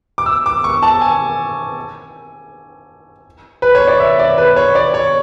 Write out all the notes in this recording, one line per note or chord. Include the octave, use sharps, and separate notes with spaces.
D6
E6
D6
C#6
A5
G#5
B4
C#5
D5
E5
D5
B4
C#5
D5
C#5